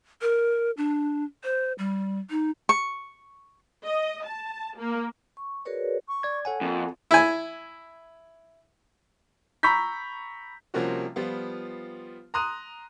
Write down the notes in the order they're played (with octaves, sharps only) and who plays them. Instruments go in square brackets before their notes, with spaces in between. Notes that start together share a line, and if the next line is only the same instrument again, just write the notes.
[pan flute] A#4
D4
C5
G3
D#4
[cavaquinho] C#6
[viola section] D#5
A5
A#3
[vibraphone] C#6
F#4 G#4 A#4 B4 C#5 D5
[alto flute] C#6
[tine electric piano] D5 G#6
[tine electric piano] A4 F#5 G#5 [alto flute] C#5
[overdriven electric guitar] F2 [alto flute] A#3
[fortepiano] E4 G#5
[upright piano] A#5 B5 C#6 E6 G6 B6
C3 F3 G3 A#3 C#4 F#4
F3 G3 B3 F4
A#5 C6 D#6 F#6 D#7